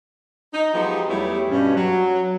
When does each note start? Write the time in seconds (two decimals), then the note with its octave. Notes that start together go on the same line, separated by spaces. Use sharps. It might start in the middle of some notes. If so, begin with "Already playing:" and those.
0.54 D#4
0.73 F3 F#3 G#3 B3 G4
1.08 E2 G3 A3 E4 G4 C#5
1.51 G2 B2 C#4
1.75 F#3